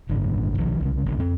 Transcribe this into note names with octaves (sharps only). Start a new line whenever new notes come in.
G#1 F#2 A#2 D3
B1 D#3 F3
C2 C#3
G1 C2 G2 D3
F2 C4